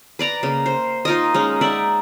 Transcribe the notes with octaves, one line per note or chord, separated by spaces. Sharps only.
B4 D5 A#5
C#3 A#3
C5
D#4 F4 A#4 D#5
G#3 C#4 D#4
D#4 D5 E5 F#5